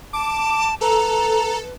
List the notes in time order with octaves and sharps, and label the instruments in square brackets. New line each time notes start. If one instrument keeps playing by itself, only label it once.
[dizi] A5 [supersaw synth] D6
[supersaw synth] A4 [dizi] B4 [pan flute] A#5